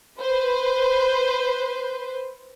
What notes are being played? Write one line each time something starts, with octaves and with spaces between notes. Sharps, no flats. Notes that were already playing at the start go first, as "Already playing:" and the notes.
B4 C5